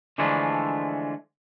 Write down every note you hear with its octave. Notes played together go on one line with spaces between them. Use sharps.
D3 E3 F3 G#3 A3 D4